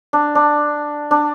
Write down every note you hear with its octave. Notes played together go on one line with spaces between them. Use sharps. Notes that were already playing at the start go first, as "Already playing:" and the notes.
D4
D4
D4